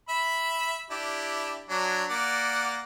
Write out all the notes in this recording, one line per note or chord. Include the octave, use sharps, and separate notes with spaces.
E5 B5
D4 E4 G4
F#3 D4
A#3 D5 F#5